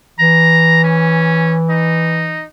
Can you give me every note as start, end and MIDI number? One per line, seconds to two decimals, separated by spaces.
0.19 2.43 52
0.19 0.81 82
0.84 1.57 61
1.70 2.45 63